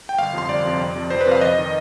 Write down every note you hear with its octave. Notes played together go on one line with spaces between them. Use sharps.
G5
G1 F5
F2 C3 F3 C6
G1 D5
F2 C3 F3
F2
C3 F3
F2 C5
B4
C3 F3 F5
F2 D#5
D#3